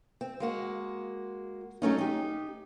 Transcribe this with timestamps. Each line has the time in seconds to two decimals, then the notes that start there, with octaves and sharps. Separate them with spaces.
0.21 C4
0.40 G#3 A#3 F#4
1.82 F#3 A3 C#4 D#4
1.98 D#4 G4